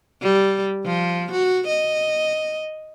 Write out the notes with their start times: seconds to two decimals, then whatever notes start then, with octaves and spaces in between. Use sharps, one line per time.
0.22 G3
0.85 F3
1.32 F#4
1.68 D#5